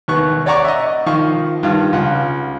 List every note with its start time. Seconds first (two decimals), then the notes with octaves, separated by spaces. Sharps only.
0.08 D#2 D#3 B3 C#6 F#6
0.46 C#5 D5 F#5 A#5 C#6 D6
0.64 D#5 E5
1.06 D#3 F3 F5 C#6
1.63 G2 D#3 F4
1.93 C#2 F4 F#5